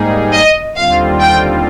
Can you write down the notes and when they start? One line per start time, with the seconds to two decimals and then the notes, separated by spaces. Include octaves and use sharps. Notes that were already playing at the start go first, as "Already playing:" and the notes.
Already playing: G#2 G3 A#3 D#4 G#4
0.33 D#5
0.76 D#2 D3 G3 C4 F4 F5
1.20 G5